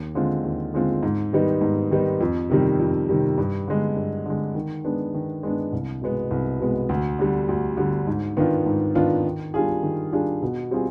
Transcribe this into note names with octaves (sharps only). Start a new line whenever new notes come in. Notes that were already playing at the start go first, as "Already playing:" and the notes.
Already playing: D#2
D3 G#3 C4 F4
D#2
D3 G#3 C4 F4
G#2
D#3 G3 B3 D#4
G#2
D#3 G3 B3 D#4
F2
C3 D#3 G3
F2
C3 D#3 G3
G2
D3 G#3
G2
D3 G#3
D#3
G#3 B3 D4
D#3
G#3 B3 D4
C2
B2 G#3 B3
C2
B2 G#3 B3
D2
D3 G3
D2
D3 G3
G#2
D#3 B3 D4 F4
G#2
D#3 B3 D4 F4
D#3
G3 D4 F4 G#4
D#3
G3 D4 F4 G#4
B2
G3 C4 F4 G#4